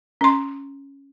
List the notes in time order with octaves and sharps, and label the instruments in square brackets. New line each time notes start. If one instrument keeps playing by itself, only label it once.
[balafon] C#4 C6